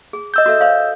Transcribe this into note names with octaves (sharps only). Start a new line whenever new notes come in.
G#4
D#5 E6 G6
F#4 A4 E5
C5 C#5 F5